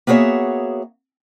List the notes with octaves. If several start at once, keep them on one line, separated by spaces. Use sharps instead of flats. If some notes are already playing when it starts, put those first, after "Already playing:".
A#3 B3 F#4 G#4 C#5 E5